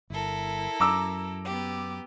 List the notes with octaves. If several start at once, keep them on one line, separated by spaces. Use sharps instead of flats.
G1 E4 A4 A#4
F#2 A#5 D6 E6
B3 G4